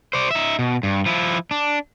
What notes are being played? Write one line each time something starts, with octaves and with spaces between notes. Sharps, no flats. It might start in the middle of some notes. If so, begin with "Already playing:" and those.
C5 D5
D#4 E5
B2
G2
F3 E4
D4